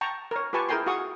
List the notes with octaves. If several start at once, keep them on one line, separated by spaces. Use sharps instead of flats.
G5 A5 A#5 C#6
A#4 C#5
F4 G4 B4 G#5 A5 C#6
E4 G#4 A#4 G5 G#5 C6
F#4 G#4 F5 C#6 D#6